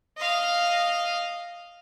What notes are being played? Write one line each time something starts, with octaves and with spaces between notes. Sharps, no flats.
D#5 F5